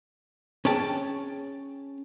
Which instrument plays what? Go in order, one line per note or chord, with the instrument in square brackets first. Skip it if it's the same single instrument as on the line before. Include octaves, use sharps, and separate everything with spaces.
[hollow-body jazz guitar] C#4 G#4 C#5 G5 A5